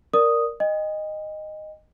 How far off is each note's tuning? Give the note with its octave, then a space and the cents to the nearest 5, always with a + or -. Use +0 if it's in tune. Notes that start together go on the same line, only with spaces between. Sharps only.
A#4 +0 D5 +0 D#6 +0
D#5 -10 G5 +45